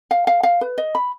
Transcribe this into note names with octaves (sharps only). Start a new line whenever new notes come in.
F5
F5
F5
B4
D#5
B5